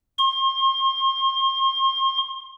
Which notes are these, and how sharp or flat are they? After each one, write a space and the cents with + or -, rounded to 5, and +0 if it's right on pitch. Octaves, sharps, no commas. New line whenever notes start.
C6 +35